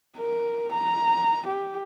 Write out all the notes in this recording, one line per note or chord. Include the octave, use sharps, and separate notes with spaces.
A#4
A#5
G4